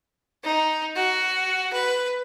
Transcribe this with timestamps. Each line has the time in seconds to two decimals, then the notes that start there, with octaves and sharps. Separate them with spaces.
0.44 D#4
0.96 F#4
1.73 B4